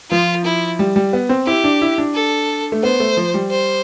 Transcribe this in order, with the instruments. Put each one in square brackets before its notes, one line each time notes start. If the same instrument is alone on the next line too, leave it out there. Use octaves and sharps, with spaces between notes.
[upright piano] F3 [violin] F4
[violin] E4
[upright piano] G3
G3
B3
C4
[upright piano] E4 [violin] G4
[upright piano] D4
E4
D4
[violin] A4
[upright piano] A3
[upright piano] B3 [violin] C5
[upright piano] A3
F3
G3
[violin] C5